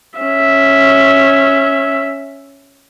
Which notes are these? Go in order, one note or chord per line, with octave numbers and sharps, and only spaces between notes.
C#4 E5